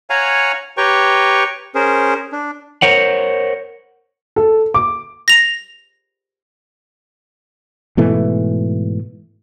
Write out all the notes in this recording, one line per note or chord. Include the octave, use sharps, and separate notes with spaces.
C#5 F5 F#5 G#5 A#5
G4 B4 C#5 G5 A#5 C#6
C#4 G#4 A#4 C5
D4
A#4 C5 C#5 F#5
A4
D6
A#6 F7
G#2 B2 E3 A3